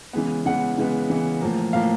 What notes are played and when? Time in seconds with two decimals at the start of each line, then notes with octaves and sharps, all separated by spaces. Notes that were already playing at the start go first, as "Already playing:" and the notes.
0.13 C#3 E3 G#3 B3
0.45 C#3 E3 G#3 B3 F#5
0.78 C#3 E3 G#3 B3
1.10 C#3 E3 G#3 B3
1.41 A2 F3 A#3
1.73 A2 F3 A#3 F5